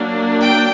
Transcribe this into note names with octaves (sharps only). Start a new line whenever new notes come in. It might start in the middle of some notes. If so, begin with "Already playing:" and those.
Already playing: F#3 A#3 D4
G5